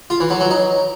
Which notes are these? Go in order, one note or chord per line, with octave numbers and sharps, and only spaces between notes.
F4
E3
F#3
F#3
D#4